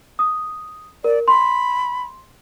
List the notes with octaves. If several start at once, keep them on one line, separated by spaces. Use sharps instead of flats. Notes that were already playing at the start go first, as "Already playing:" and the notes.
D#6
A#4 D5
B5 C6